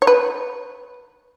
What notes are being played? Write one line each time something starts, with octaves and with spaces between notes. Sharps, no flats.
C#5
B4